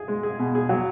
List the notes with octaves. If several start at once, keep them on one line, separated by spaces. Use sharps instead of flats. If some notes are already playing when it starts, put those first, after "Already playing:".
Already playing: G#4
G#3
G#4
B2
G#4
F#3